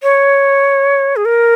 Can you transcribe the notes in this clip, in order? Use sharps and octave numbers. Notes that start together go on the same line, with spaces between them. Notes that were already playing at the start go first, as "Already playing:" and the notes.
C#5
G#4
A#4